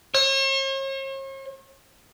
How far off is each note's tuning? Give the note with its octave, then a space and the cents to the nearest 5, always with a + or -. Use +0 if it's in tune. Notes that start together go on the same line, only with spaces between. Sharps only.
C#5 -45